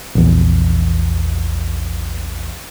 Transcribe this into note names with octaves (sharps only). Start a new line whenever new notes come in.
A#1 E2